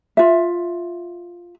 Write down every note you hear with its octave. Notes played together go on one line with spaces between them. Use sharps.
F4 E5